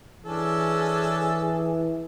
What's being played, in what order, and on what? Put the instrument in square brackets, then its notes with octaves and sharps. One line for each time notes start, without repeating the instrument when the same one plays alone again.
[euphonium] E3 [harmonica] C#4 D4 A4 [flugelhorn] G#4